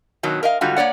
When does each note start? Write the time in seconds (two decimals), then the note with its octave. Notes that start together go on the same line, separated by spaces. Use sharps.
0.23 B2 D#3 F#3
0.43 A#4 D#5 F5
0.61 G#2 D3 G3 F4 F#4
0.76 A#3 C#5 D5 F#5